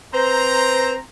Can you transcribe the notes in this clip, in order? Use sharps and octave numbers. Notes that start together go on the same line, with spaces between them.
C4 B4 C5 A#5